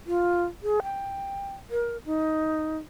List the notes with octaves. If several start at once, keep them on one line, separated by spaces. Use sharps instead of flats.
F4
G#4
G5
A#4
D#4